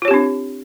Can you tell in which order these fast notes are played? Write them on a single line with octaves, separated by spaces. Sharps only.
F4 C#5 G4 C4 D4